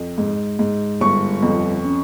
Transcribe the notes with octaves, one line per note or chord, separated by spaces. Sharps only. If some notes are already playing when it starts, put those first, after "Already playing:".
Already playing: F2
G#2
G#2
G1 C#6
F2
C#4